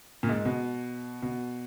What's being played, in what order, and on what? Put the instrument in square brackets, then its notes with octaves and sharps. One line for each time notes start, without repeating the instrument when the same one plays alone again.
[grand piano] A#2
G#2
B2
B2